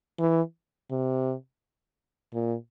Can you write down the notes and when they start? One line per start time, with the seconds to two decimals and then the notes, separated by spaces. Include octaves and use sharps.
0.19 E3
0.91 C3
2.34 A#2